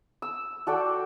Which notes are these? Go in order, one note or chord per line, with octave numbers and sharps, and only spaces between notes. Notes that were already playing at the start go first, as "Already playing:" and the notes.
E6
F#4 A4 D5 G5